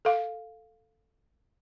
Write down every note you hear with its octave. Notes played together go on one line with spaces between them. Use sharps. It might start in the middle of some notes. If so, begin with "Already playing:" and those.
A4 F5